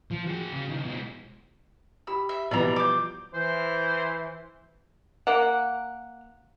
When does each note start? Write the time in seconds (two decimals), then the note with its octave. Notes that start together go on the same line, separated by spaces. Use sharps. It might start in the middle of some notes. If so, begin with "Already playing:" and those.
0.11 F3
0.27 F#4 G#4
0.52 C#3
0.69 D#3 F3
0.85 B2 G#3
2.07 G4 B5 E6
2.29 E5
2.51 B2 E3 F3 G3 B3 D5 E5 A#5
2.76 D6 G6
3.34 E3 C5
5.27 A#3 F#5